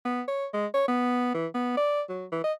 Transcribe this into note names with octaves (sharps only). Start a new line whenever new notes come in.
B3
C#5
G#3
C#5
B3
E3
B3
D5
F#3
E3
D#5